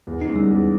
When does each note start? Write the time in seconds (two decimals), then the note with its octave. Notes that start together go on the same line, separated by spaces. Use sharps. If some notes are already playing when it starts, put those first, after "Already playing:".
0.07 E2
0.21 D#4
0.29 C#3 G#3
0.36 G3
0.51 E2